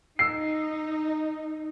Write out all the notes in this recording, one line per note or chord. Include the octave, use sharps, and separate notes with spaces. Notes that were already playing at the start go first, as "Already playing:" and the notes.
D#4 E6 C7